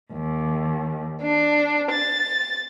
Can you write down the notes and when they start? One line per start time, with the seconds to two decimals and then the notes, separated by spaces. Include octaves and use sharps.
0.11 D#2
1.22 D4
1.90 A6